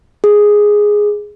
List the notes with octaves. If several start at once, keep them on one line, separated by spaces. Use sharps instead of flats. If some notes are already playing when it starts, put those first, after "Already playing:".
G#4